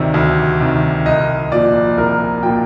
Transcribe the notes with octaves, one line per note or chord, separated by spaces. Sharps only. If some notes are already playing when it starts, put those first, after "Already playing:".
Already playing: D2 C3 D#3 D5
D2
C3 D#3
C2 D#5
A#2 F3 D5
C2 A#4
A#2 F3 G5